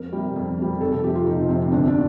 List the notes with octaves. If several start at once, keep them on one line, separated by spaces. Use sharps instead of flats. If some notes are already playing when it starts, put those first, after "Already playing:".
Already playing: F2 A#4
C3 G3
F2
C3 G3
F1 A4
A4
F2 C3 G4
F4
F1 D#4
F2 C3 C4
C4
G1 D4
D4